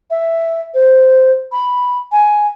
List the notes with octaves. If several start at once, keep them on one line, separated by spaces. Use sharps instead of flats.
E5
C5
B5
G#5